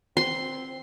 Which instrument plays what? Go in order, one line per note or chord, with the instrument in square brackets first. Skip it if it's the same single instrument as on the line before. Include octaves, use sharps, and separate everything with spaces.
[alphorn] C4 [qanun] C6